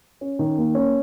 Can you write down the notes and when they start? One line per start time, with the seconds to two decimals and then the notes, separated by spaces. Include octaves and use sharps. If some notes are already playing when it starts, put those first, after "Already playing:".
0.21 C#4
0.39 D#3
0.58 A#3
0.75 C#4